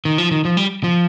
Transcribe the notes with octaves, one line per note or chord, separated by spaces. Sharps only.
D#3
F3
D#3
F3
G3
F3